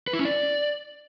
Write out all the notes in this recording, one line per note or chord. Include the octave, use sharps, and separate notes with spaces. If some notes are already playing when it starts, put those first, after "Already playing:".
B4
E4
C#4
D5